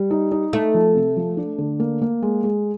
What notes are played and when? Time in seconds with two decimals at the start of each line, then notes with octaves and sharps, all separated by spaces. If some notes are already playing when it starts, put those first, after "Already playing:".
Already playing: G3
0.11 D#4
0.32 D#4
0.53 A3 D#4
0.74 F3
0.95 C3
1.17 F3
1.37 D4
1.58 D3
1.80 A#3
2.01 A#3
2.22 G#3
2.44 G#3